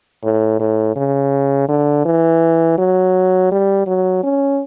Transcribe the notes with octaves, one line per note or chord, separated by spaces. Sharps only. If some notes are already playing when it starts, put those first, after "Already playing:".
A2
A2
C#3
D3
E3
F#3
G3
F#3
C#4